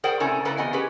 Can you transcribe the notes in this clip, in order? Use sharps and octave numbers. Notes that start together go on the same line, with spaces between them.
G#4 A#4 C5 D5 F#5 G5
A2 C3 C#4 A4 G#5 A#5
C#3 A3 A4 B4 D5 A#5
E2 C3 B3 D#5 F#5 G#5
C#4 G4 G#4 B4